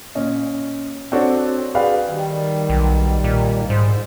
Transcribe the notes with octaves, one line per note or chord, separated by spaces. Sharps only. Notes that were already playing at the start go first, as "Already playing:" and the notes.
A#2 C#4 D#5
C4 D4 F#4 A4 C#5 F#5
F#4 G#4 B4 D5 F5 G5
D#3 G3
B1
A#2
G#2 C5